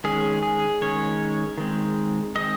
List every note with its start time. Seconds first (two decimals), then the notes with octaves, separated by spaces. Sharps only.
0.04 D#3 G#3 C#4 G#4
0.43 G#4
0.81 D#3 G#3 C#4 C#5
1.58 D#3 G#3 C4
2.36 D#3 G#3 C4 D#5